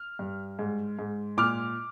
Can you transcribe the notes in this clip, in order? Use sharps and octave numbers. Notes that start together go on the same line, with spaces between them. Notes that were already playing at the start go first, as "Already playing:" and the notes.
Already playing: F6
G2
G#2
G#2
A#2 D6 F6